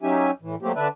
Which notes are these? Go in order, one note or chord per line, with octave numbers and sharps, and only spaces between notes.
F#3 C#4 D#4 G4 E5 G#5
A2 E3
F#3 A3 A#3 C4 G4
D3 D4 B4 D5 E5 A5